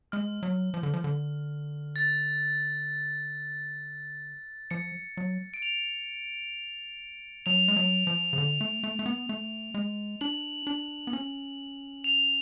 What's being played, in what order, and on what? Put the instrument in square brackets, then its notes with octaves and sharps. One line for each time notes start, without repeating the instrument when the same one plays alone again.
[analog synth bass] G#3 [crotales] F6
[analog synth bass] F#3
F3
D3
F3
D3
[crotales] A6
[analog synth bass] F3 [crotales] C#7
[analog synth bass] F#3
[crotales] D7
F7
[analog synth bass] F#3 [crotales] F7
[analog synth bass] G#3
F#3
F3
C#3
D3
A3
A3
A3
B3
A3
G#3
[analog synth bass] D4 [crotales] F#7
[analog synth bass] D4
B3
C#4
[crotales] F7